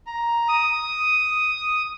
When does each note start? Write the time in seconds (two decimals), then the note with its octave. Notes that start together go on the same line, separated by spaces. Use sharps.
0.07 A#5
0.48 D#6